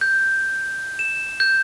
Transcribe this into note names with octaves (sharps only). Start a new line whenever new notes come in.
G6
E7
G6